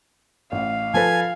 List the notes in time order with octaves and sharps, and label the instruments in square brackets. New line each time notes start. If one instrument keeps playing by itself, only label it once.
[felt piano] A1 [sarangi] F5
[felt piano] F3 A4 B4 [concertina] G#5